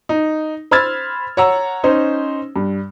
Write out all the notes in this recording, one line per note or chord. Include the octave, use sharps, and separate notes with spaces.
D#4
C5 B5 E6 F6 G#6 A6
C#5 F#5 A#5 E6
C#4 D#4 C5
G2